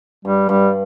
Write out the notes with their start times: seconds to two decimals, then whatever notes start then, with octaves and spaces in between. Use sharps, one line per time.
0.25 G2 G3
0.49 G2 G3